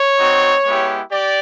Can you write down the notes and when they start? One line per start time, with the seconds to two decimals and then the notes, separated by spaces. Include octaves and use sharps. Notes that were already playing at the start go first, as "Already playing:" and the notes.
Already playing: C#5
0.19 C4 D#4 F#4
0.64 G#3 B3 E4 G4
1.11 G4 D5